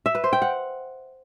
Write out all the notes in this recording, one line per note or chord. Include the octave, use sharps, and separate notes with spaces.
E5
B4
C5
G5
F#5